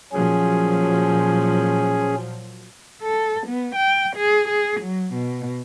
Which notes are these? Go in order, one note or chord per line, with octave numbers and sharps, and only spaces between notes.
A#2 F3 F#3 C#4 G#4
A4
B3
G5
G#4
G#4
F#3
B2